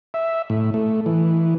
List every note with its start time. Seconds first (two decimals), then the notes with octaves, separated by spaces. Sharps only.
0.14 E5
0.50 A2
0.74 A3
1.06 E3